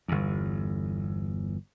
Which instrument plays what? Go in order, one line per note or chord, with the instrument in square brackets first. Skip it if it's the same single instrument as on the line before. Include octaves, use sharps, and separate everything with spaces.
[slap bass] G1 E2